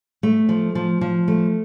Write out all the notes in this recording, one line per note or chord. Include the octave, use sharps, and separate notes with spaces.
A3
F3
F3
F3
A3